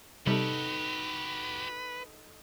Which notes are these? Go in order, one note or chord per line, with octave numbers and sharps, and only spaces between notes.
C3 G3 D#4 F#4 G4 A4 B4